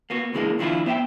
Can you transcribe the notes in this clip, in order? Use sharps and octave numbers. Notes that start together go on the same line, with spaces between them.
A#3 B3 F#4
C#3 E3 G#3 A#3 D4
D#3 F3 D4 E4 F4
B3 C5 E5 F#5 G5